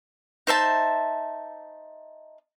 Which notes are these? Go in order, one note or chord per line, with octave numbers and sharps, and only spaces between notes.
D#4 C5 E5 A5